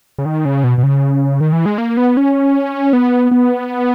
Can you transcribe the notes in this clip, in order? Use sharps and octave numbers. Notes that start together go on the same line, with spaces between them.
C#3
D#3
C#3
B2
B2
C#3
D#3
E3
G#3
A#3
B3
C#4
B3
B3